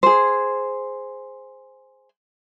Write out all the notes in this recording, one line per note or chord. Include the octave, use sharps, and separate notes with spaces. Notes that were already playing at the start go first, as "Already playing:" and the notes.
G#4 C5